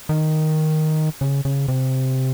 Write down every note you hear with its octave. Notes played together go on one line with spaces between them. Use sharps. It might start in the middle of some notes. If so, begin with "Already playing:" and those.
D#3
C#3
C#3
C3